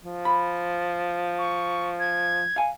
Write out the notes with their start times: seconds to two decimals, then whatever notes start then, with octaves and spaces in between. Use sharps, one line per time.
0.03 F3
0.25 B5
1.38 C#6
2.00 G#6
2.56 F5 G#5